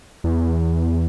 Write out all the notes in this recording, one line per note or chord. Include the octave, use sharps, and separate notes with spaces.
E2